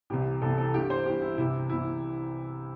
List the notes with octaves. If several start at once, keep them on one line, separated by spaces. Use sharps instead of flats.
C2 C3 E3 G4
C2 C3 E3 A4
A4
G2 E3 G4
C5
G2 E3 G4
E4
C2 C3 E3 E4
C3 E3 E4